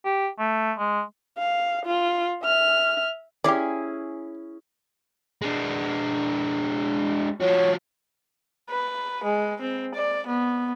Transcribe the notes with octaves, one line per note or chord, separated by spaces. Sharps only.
G4
A3
G#3
F5
F4
E5 F6
C#4 E4 G4 G#4 D5
G#3 D4
F3 F#4 C#5
B4
G#3
C4
D5
B3